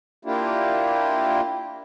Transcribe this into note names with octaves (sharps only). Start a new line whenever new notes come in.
A#3 D4 E4 F4 G4